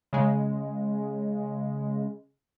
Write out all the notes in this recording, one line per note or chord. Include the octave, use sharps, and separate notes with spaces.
C#3 G#3